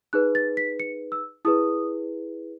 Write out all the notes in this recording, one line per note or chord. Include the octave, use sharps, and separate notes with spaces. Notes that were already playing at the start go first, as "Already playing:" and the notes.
D#4 G#4 B4 F#6
A6
B6
C#7
E6
E4 G#4 B4 D#6